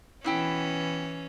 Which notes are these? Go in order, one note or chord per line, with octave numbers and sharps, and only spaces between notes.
B2 E3 C#4 E4 G5